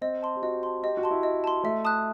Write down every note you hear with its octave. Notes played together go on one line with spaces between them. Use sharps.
C4 D#5
A5 C6
G4
F#4 D#5
A5 C6
G4 D#5
F#4
A5 C6
E4
D#5
A5 C6
A3 E5
A5 D#6 F#6